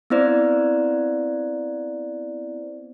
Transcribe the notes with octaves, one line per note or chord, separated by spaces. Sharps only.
B3 C4 E4 C5 D5